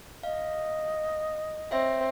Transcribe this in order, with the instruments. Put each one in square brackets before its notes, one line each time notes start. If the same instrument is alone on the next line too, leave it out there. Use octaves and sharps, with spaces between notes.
[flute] D#5 [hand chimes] F5
[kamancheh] C4 [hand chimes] C#5 E5 A#6